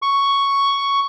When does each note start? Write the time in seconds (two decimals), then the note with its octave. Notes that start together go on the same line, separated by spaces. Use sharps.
0.02 C#6